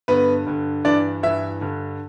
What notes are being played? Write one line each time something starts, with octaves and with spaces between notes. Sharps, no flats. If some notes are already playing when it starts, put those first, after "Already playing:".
G2 D3 B3 B4
G2 D3
G2 E3 D4 D5
G2 E3 E4 E5
G2 D3